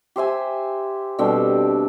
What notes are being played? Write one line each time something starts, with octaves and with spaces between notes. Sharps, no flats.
G4 C5 E5 G#5
B2 D3 G3 C4